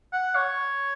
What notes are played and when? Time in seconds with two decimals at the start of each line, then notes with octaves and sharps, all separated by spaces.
0.12 F#5
0.35 C#5